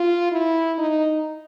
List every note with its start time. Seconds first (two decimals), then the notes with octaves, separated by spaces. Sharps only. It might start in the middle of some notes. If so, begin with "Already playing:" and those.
Already playing: F4
0.32 E4
0.78 D#4